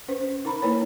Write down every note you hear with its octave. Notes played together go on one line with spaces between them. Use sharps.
C#4 B4 C5
D#4 A#4 A#5 B5
A#3 D#4 E4 A#4 B4 C#5